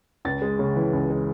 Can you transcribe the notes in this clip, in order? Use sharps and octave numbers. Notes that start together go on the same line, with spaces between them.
C#2 A6
G#3
C#3
E3
C#2
G#3